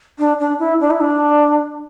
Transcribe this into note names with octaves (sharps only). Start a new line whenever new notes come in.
D4
D4
E4
D4
E4
D4